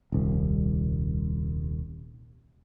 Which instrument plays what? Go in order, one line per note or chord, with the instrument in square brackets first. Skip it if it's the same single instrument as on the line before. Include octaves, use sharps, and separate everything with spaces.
[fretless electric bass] D#1 C2